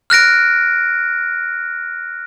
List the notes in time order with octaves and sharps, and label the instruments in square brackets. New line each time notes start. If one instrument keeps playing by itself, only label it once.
[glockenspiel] F6 F#6 A#6 D7